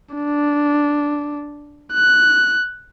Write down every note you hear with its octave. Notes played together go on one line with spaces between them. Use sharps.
D4
F#6